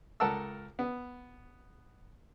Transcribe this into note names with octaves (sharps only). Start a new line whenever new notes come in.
C#2 A4 A#4 F#5 A5 E6
B3